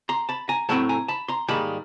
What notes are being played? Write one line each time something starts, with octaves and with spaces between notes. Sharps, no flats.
A#5 C6
A5 B5
G#5 A#5
A2 F#3 A3 C4 A5 B5
G#5 A#5
A5 B5
A#5 C6
G#2 D#3 G3 A#3 A5 B5